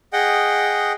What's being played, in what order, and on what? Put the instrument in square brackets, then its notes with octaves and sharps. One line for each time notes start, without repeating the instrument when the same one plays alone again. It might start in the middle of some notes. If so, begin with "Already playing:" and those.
[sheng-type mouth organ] G#4 D#5 F#5 G5